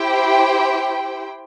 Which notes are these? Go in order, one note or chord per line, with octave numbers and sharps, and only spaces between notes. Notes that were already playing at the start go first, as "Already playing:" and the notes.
Already playing: E4 G4 C5 G5